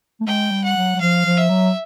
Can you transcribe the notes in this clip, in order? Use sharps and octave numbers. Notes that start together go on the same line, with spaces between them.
A3
G#3 G5
G3
F#5
F#3
F#3
F3 F5
F3
E5
F#3